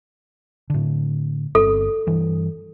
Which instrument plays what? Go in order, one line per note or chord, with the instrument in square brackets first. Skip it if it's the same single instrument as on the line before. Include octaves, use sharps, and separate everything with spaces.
[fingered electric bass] A2 D3
[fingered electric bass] G1 C4 [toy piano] A4
[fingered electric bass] G2 E3